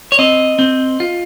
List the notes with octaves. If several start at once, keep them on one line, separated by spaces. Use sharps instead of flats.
C#5
C4 D#5
C4
F4